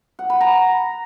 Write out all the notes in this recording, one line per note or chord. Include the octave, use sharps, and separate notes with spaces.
F#5
B5
A#5